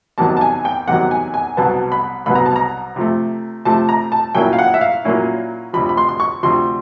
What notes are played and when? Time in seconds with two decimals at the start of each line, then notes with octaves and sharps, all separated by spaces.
0.18 E2 C3 D#3 F#3 A5
0.37 A5
0.41 G#5
0.65 G5
0.88 E2 C3 D#3 F#3 F#5
1.11 G#5
1.34 G#5
1.57 C2 B2 F#3 B3 A5
1.92 B5
2.26 C2 B2 F#3 B3 B5
2.35 A#5
2.46 A5
2.56 A#5
2.96 C3 F3 A3
3.65 C3 F3 A3 A5
3.89 A#5
4.12 A5
4.35 A#2 F#3 A#3 C#4 E4 G5
4.53 F5
4.59 F#5
4.74 E5
4.81 F5
5.05 A#2 F#3 A#3 C#4 E4
5.73 D2 C3 F3 B5
5.89 B5
5.97 C6
6.09 C6
6.20 C#6
6.43 D2 C3 F3 C6